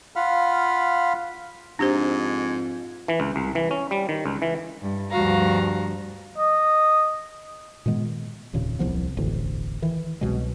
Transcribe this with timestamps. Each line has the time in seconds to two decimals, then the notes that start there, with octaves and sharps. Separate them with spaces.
0.16 F4 F5 F#5 B5 F6
1.79 F2 G#2 D4 G4 C5
3.08 E3
3.20 C#2
3.36 C2
3.55 E3
3.71 C#4
3.91 G3
4.09 D#3
4.26 C#2
4.42 E3
4.82 G2
5.11 D2 G2 F3 F#4 F5 A#5
6.37 D#5
7.86 A#2 D#3 G#3 B3
8.53 F1 D#2 A#2 C#3
8.79 D#1 C2 F3 B3
9.17 E1 A1 D2
9.82 D#3 E3
10.21 C2 B2 F#3 G#3